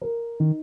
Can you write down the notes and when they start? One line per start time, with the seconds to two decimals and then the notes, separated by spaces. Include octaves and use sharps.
0.01 A#4
0.40 D#3 D#4